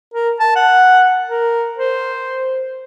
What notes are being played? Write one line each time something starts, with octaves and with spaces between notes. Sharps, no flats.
A#4
A5
F#5
A#4
C5